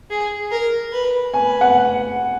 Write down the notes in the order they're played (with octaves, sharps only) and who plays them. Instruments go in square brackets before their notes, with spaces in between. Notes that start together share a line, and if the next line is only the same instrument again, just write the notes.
[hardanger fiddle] G#4
A#4
B4
[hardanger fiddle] B4 [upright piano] G#5
[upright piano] F#5